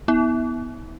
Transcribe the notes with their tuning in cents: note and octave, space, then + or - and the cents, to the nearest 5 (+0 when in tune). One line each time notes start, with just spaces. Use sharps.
B3 +0 E4 -40